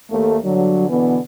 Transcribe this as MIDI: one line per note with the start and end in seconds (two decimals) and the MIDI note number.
0.11 0.37 39
0.11 0.37 57
0.44 0.88 43
0.44 0.88 50
0.44 0.88 54
0.89 1.18 47
0.89 1.18 50
0.89 1.18 52
0.89 1.18 59